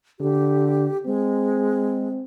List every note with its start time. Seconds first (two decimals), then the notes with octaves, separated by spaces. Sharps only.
0.20 D3 G4
1.06 G#3 C4